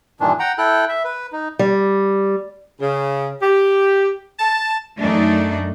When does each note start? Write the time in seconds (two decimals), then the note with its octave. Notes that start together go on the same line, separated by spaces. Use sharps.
0.20 G2 A#2 D#3 E3 D4
0.40 F#5 G5 A#5
0.58 E4 A4 G5 F#6
0.89 E5
1.05 B4
1.32 D#4
1.59 G3
2.80 C#3
3.41 G4
4.39 A5
5.00 F#2 A3 D4 D#4